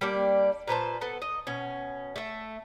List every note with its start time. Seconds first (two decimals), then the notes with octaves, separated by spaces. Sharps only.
0.01 G3 A#3 D4 G4
0.68 A#2 B4 C5 A5
1.01 B3 A4
1.22 D#5
1.47 B2 C#4
2.16 A3 E5